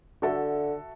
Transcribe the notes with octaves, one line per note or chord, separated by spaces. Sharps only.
D3 F#4 A4 E5